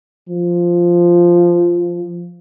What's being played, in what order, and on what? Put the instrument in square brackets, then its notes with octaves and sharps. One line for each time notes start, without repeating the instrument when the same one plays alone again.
[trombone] F3